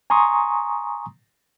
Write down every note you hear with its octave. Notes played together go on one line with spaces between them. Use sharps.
G#5 A#5 C6 C#6 D#6